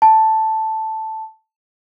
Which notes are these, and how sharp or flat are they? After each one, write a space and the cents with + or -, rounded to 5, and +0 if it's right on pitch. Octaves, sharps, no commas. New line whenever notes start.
A5 +0